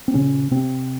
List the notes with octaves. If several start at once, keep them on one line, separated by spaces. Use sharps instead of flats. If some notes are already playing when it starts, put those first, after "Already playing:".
C4
A#2 C#3 C#4
C3 C4